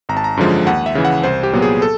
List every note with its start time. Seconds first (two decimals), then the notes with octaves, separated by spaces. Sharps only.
0.09 G#1 A#5
0.17 A5
0.24 A#5
0.37 F#2 D3 F3 G#3
0.67 D#2 F#5
0.86 E5
0.95 C#3 E3
1.05 F#5
1.23 C2 C5
1.43 G4
1.53 A#2 F#3 B3
1.62 G#4
1.82 A4